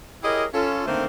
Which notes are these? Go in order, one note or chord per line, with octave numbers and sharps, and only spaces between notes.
E4 G4 G#4 A#4 C#5 D#5
C#4 F4 A4
D3 D#3 A3 A#3 C4 C5